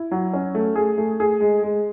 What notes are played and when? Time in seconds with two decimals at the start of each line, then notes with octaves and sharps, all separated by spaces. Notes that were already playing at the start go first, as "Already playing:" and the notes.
Already playing: E4
0.11 F#3
0.33 C#4
0.55 A3
0.76 G#4
0.98 A3
1.20 G#4
1.40 G#3
1.63 G#3